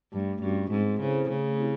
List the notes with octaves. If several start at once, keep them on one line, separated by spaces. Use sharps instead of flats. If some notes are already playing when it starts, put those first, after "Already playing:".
G2 A3
G2 C#4 F#4
G#2 C4
C#3 E4 A4 C5
C#3 A3
C4 E4 G4